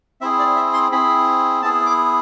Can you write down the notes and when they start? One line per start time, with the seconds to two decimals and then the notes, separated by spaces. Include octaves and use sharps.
0.21 C4 E4 G#4 E5
0.39 D5
0.56 E5
0.73 C6
0.92 C4 E4 G#4 B5
1.62 B3 E4 G#4 A5
1.86 D6